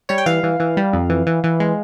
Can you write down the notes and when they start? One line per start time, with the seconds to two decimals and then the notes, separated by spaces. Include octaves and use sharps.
0.09 G3 C#5
0.18 G5
0.26 E3 F5
0.43 E3
0.60 E3
0.77 G3
0.93 F2
1.10 E3
1.27 E3
1.44 E3
1.60 G#3